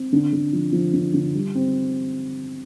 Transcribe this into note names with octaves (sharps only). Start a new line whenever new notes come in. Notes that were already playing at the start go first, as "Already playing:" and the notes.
Already playing: C4
D3
D3
F3
F3
D3
D3
G3
C4